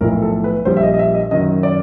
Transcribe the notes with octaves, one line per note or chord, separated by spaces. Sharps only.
B1 A2 F3 A#4
A4
B4
A#1 A#2 G3 C5
E5
D#5
D#5
E5
D#5
F#2 D#3 F#3 D#5
D5